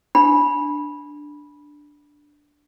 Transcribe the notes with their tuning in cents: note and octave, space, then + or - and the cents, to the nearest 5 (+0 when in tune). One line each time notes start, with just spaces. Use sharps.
D4 +0 B5 -15